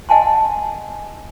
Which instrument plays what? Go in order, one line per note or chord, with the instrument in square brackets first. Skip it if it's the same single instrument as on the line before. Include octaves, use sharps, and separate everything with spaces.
[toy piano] D#5 F#5 G#5 A5 C6